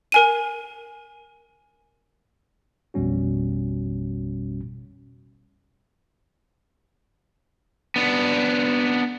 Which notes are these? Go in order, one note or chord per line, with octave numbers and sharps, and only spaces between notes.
A#4 G#5 D#7
A1 F2 B2 G3 C#4 F#4
B3 D4